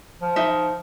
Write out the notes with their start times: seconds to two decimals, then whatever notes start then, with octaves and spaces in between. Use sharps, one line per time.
0.22 F3
0.36 D#4 E5